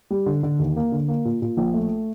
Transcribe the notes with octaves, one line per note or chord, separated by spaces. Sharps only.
G3
D3
D3
D#2
A#3
D3
A#3
A#2
A#2
A#1
A3